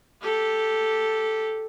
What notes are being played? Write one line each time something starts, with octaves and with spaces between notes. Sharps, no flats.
G4 A4